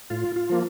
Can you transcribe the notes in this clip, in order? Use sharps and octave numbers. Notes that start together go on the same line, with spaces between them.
A2 F4
F4
F3 A#3